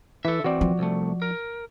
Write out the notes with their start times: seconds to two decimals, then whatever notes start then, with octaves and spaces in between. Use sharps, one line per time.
0.25 E3 A4 E5
0.44 E3 C4 F#4 D5
0.61 F3
0.79 C2 A3
1.22 A#4